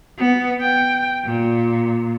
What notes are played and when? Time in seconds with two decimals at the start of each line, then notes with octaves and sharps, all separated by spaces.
0.18 B3
0.61 G5
1.25 A#2